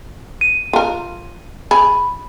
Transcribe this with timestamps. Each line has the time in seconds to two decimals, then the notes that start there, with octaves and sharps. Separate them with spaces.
0.41 D#7
0.73 F4 A#4
1.71 G#4 B5